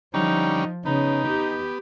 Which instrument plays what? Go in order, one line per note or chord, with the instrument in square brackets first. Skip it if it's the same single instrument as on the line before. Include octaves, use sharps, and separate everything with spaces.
[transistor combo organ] D3 G3 C#4 [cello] F3 [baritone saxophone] D#4
[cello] C#3 [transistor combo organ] B3 [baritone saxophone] D#4
[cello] G4